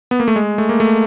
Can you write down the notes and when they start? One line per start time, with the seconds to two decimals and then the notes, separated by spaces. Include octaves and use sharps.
0.11 B3
0.20 A#3
0.28 A3
0.36 G#3
0.58 A3
0.69 A#3
0.80 A3